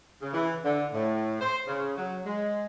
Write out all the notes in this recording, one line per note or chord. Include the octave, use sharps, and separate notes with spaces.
C#3
E3
D3
A2
C5
C#3
F#3
G#3